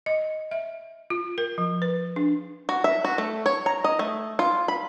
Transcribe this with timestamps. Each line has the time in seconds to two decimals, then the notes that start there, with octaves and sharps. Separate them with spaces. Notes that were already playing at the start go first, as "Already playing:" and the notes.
0.06 D#5
0.51 E5
1.10 F4
1.38 A#4
1.58 F3
1.82 B4
2.16 D4
2.69 F#4
2.84 E5
3.04 F#4
3.18 A3
3.46 C#5
3.66 A#5
3.84 D#5
3.99 A3
4.39 F4
4.68 B5